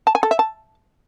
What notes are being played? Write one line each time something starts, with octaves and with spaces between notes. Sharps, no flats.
A5
G#5
A4
E5
A5